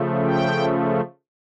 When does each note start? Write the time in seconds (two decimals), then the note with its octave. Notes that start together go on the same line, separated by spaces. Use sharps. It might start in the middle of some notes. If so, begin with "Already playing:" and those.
Already playing: C#3 F3 A3
0.26 G5